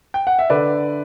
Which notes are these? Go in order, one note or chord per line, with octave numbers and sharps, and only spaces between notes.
G5
F#5
E5
D3 B4 D5